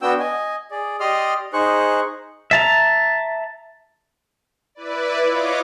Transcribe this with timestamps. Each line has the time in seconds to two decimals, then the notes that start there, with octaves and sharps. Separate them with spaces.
0.02 B3 D4 F#4 G5 E6
0.20 D#5 G#5
0.71 G#4 D5
1.00 G4 D5 D#5 C6 D#6 F6
1.53 D#4 G#4 C5 C#6 F#6
2.51 E5 A5 A#5
4.75 E4 B4 D5
5.26 F4 C#5 D#5 D6